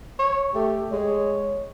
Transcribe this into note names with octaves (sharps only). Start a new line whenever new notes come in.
C#5
A3 G4
G#3 C#5